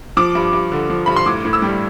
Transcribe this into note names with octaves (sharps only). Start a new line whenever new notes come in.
F3 D6
G2
G2
D3
F3
G2 B5
C6
A2 D6
A2
E6
G3